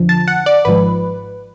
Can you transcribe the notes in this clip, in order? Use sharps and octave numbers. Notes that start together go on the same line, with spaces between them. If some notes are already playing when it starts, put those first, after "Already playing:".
Already playing: F2 D3 F3
A5
F#5
D5
G#1 G#2 F3 B4